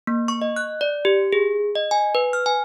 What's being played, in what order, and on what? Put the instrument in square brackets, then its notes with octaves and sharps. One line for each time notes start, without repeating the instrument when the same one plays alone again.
[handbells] A#3
C#6
D#5
F#6
D5
G4
G#4
D#5
G#5
B4
F6
G#5